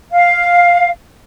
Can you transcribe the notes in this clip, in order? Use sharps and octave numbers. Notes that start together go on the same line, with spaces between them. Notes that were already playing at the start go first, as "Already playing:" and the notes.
F5